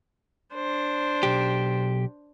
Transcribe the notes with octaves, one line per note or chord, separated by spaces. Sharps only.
D4 C5
B1 G4